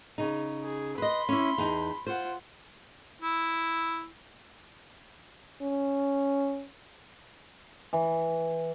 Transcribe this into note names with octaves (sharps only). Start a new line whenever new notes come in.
C#3 D#4
G#4
B4 D#5 B5 C6
C#4 E4
E2 D#4
F4 C5 F#5
E4
C#4
E3